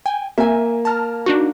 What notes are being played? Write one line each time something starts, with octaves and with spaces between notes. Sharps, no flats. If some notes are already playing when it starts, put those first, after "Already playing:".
G5 G#5
A#3 E5 G#5
A5 A#5 F6
D4 D#4 F#4